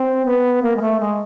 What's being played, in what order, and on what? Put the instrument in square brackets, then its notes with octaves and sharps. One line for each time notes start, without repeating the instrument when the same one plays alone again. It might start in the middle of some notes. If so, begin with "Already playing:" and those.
Already playing: [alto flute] C4
B3
A#3
G#3
A3
G#3